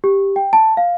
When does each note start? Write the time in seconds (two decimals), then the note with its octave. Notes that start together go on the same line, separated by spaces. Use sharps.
0.04 G4
0.36 G5
0.53 A5
0.77 F5